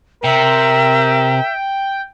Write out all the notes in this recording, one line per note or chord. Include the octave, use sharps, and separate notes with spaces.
C3 A#4 E5 G5